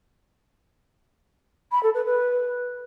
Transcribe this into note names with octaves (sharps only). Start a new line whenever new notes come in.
B5
A4
B4
B4